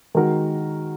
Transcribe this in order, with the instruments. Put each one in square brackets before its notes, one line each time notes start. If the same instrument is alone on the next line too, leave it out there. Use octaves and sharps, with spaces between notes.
[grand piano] D#3 G#3 F#4 A#4